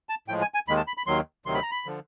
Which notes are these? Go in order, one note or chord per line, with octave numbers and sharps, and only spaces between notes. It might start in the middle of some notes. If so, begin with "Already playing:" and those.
A5
A2 F3 G#3 G5
G#5
G#5
D#2 D#3 G#3 B5
A5
B5
B5
D#2 D#3 F#3 C6
D2 C3 D#3 F#3 C6
B5
A#5
B5
D3 F3